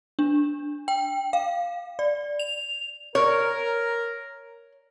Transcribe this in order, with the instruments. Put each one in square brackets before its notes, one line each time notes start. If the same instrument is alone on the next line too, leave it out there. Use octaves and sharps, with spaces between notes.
[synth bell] D4
G5
F5
D5
F7
[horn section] A#4 [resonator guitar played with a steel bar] C#5